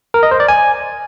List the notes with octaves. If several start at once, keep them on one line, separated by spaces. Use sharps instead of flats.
A#4
D#5
C5
D5
G#5